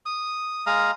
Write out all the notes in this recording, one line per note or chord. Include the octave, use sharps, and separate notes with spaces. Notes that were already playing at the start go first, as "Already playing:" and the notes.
D#6
G#3 F5 A#5 D#6